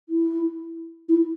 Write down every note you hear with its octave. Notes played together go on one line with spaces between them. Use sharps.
E4
E4